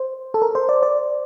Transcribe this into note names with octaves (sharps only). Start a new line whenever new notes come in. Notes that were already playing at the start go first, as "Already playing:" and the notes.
Already playing: C5
A4
A#4
C5
D5
D5